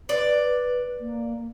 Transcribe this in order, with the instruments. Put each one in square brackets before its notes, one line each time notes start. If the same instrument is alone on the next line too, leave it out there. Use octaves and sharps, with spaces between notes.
[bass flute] B4 [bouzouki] D5
[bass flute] A#3